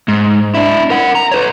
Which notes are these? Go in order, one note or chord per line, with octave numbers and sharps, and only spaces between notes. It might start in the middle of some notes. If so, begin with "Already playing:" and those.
G#2
D4 E4
A#4 F#5
A#5
B4 C#5